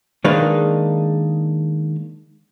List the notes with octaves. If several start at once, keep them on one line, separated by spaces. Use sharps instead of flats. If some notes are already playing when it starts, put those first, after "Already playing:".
D#3 G#3 A#3 D4 D#4 B4